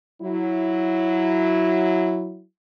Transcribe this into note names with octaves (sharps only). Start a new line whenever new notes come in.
F#3 E4